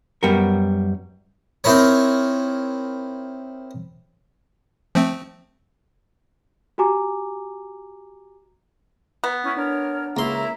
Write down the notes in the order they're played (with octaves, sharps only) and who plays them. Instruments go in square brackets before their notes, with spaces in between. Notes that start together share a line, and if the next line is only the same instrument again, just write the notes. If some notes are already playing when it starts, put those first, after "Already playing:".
[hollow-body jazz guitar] F#2 G3 B3 A#4
[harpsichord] C4 D#4 E4 A#4 C#5
[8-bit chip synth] F3 A3 C4
[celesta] F#4 G4 G#5 A#5 D6
[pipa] B3
[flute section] C#4 E4
[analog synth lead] D4 [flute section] A#4 C#5
[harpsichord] C#2 C6 [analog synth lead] A#3 [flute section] E4 E5 A#5